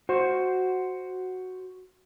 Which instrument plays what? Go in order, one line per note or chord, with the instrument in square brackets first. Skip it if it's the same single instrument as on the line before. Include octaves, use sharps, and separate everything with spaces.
[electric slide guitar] F#4 C5